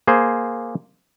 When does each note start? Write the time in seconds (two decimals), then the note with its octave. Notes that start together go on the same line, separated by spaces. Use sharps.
0.08 A#3 G#4 C5